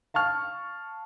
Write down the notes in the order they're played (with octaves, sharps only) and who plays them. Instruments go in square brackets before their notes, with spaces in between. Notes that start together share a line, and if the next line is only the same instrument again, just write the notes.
[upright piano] F5 A5 C#6 F6